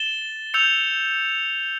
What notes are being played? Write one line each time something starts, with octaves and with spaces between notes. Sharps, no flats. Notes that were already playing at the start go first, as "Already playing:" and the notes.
Already playing: A6 E7 G7
E6 G6 C#7 F7